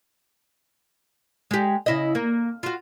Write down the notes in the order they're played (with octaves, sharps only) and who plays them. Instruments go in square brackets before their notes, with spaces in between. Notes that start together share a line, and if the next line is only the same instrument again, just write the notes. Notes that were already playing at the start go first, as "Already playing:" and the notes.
[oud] G#3 G4
C#3 E4 D#5
A#3
F4 F#4